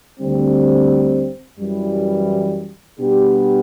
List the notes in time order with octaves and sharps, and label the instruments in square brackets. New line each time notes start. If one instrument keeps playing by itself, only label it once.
[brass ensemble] D2 D3 G3 C4
F#2 E3 G3
B2 G3 B3 D4 G4